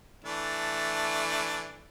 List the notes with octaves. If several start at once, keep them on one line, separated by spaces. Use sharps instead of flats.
E3 A3 D4